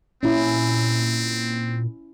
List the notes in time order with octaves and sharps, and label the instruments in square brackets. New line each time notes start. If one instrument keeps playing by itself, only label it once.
[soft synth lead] A#2 [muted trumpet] C4 [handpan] C#4 E4